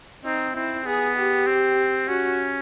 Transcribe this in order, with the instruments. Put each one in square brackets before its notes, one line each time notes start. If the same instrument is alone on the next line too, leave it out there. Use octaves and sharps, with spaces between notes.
[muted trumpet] C4 [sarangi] D#4
[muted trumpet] C4 [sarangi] E4
[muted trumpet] B3 [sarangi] G#4
[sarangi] G4
[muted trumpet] C4
[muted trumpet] C#4 [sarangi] F#4